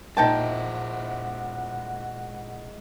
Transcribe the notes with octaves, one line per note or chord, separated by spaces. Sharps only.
A#2 G#3 D#4 E4 F#4 C5 G5 A5